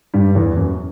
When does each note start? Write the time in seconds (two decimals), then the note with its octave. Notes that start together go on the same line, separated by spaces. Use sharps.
0.14 G2 G3
0.35 E2 E3
0.57 F#2